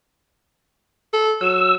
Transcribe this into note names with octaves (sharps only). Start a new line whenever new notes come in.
A4
F#3 E6